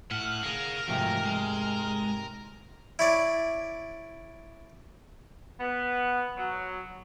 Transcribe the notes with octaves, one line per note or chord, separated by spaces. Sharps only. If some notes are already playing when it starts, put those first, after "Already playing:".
A2 F#5 F6
G#4 A#4 F5
G#2 C3 F3 F#3 A3
G#3
E4 C#5 D5
B3
F#3